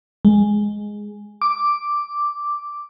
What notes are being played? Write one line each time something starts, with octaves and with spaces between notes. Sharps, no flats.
G#3
D6